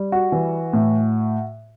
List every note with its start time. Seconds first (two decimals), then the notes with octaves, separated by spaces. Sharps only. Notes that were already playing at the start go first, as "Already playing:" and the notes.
Already playing: G3
0.12 F#4
0.32 E3
0.73 A2